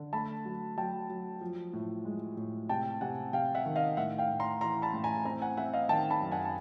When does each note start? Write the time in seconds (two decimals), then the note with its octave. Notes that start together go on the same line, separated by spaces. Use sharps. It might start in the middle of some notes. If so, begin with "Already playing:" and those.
Already playing: D3
0.13 A3 A5 B5
0.45 F#3
0.77 F#3 G5 A5
1.09 F#3
1.41 F3
1.73 A2
2.05 G#3
2.37 A2
2.69 C3 G5 A5
3.01 C3 F#5 G#5
3.33 C3 F5 G5
3.55 E5 F#5
3.66 D#3
3.76 D#5 F5
3.97 A2 E5 F#5
4.18 F5 G5
4.29 A2
4.40 A#5 C6
4.61 E3 A#5 C6
4.82 A5 B5
4.93 A2
5.04 G#5 A#5
5.25 C4 G#5 A#5
5.42 F#5 G#5
5.57 C4 E5 F#5
5.73 D#5 F5
5.89 D#3 G5 A5
6.10 A5 B5
6.22 F#2
6.32 F#5 G#5
6.45 A5